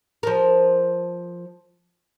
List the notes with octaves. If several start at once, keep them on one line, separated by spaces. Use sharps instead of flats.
F3 A#4